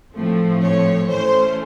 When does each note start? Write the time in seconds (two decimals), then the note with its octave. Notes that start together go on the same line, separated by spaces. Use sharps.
0.14 A2 F3 A3 C4
0.61 C#5
1.09 E3 A3 C#4 C5